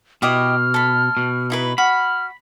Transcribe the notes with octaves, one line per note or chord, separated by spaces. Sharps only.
B2 E4 G4 D#5 F6
A4 B5
B2
D#4 E4 B4
F#4 B5 F6